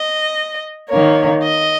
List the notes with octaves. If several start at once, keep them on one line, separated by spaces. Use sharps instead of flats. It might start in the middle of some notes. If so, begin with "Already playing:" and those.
Already playing: D#5
A#3 C#5
D#3
D#5